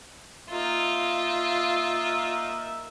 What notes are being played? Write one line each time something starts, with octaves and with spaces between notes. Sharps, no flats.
A#3 D#4 F4 E5